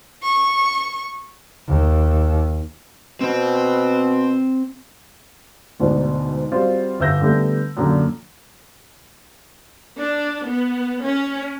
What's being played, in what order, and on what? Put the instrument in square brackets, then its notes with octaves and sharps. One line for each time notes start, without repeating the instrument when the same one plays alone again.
[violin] C#6
[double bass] D#2
[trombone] B2 [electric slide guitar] C4 C5
[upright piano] D2 G#2 B2 D4
G3 C4 F4 F#4 C5
G1 E5 E6 G6 A#6
D3 G3 A3 B3
F#2 A#2 D3
[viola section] D4
B3
C#4